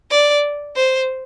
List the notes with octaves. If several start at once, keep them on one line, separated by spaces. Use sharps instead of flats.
D5
C5